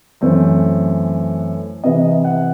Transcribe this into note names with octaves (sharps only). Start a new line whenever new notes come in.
F#2 E3 A3 C4 C5
C3 E3 B3 D#5
F#5